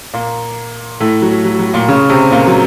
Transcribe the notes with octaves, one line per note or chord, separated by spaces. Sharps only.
A#2 A#3
A2 A3
F#3
F#3
F#3
A#2 A#3
C#3 C#4
C3 C4
A#2 A#3
F#3